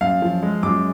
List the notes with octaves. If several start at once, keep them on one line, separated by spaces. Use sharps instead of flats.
F#2 F5
F3
G#3
F#2 D6